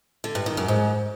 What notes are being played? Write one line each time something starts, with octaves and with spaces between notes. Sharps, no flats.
D3
G2
D#3
F#2
G#2